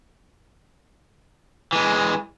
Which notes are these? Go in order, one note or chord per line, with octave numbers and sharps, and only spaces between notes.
E3 G#3